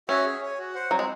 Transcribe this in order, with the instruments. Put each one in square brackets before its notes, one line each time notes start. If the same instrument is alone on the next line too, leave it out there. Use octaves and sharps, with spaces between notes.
[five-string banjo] C#4 [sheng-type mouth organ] F#4 C#5 E5 G#5
[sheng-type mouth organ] G#4
C#5 G#5
F#4
C5 F#5
[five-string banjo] F#3 [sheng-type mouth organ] C4
[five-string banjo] G#3